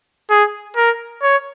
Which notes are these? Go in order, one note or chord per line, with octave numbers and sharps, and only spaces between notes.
G#4
A#4
C#5